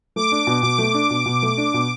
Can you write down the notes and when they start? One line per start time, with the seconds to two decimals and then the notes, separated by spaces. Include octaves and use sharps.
0.16 A3 D6
0.32 D4
0.47 B2
0.63 B2 D6
0.78 A3
0.94 D4
1.10 B2
1.26 B2
1.42 A3
1.58 D4
1.74 B2